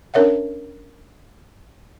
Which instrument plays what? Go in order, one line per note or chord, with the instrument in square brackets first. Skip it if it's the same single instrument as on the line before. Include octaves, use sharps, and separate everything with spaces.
[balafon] C#4 D4 A#4 C#5 E5 F#5